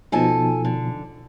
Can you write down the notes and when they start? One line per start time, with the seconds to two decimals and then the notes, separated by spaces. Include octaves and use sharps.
0.12 B2 F3 D#4 A4 G#5 A5
0.65 D3